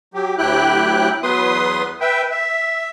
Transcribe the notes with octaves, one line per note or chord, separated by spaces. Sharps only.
F#3 G4
D2 F#3 E4 G4 G5 F#6
E2 F#3 B3 B4 C6 D#6
B4 E5 G5
E5